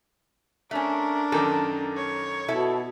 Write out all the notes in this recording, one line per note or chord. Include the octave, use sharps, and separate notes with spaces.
A3 C#4 D4 A#4
F#2 D#3 A4 D6
C#5
B2 E4 A4